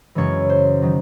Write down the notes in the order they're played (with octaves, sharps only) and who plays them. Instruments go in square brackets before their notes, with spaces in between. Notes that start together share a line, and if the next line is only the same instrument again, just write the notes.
[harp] F#2 C#3 E3 G#3 C#5
C5
D#3 F#3